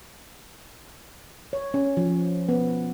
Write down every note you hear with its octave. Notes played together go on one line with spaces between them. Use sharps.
C#5
C#4
F3
B3